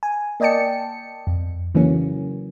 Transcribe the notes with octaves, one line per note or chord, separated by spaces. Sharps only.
G#5
A#3 D5 D#5 G5 A5 C#7
F2
C#3 E3 F#3 A#3 C#4